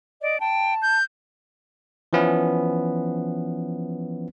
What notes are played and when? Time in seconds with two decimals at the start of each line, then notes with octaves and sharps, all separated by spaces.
0.22 D5 D#5
0.40 G5 A5
0.82 G6
2.13 E3 F3 B3 C#4 E4